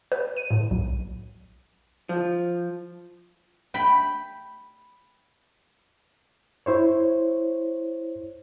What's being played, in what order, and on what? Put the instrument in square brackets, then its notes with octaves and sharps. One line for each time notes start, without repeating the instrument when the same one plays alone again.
[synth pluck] B4
D#7
A2
B1
[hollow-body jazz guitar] F3
[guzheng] G5 B5
[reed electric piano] E4 C5 C#5